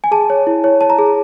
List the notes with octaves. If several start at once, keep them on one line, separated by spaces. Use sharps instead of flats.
G#5
G#4 A5
C#5
E4
C#5
C#5 A5
A#5
G#4